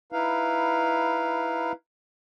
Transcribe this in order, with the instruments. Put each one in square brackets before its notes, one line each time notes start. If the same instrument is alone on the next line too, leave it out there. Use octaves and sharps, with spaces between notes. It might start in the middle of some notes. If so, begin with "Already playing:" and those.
[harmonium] D#4 E4 B4 F5